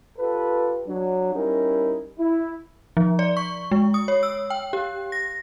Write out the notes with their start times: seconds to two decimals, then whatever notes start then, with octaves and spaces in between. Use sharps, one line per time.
0.19 F4 G4 A4 B4
0.87 F#3 D4
1.34 G3 C#4 D#4 E4 G4 A#4
2.20 E4
2.97 F3
3.19 D5
3.37 C#6
3.72 G#3
3.94 D#6
4.08 C#5
4.23 E6
4.50 G5
4.73 G4
5.12 A#6